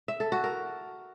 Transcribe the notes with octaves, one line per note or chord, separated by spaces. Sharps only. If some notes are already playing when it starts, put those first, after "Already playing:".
E5
A4
F#4
A#4